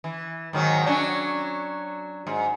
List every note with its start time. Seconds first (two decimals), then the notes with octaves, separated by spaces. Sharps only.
0.04 E3
0.53 G#2 D#3 F#3
0.86 F#3 C#4 D4
2.27 G#2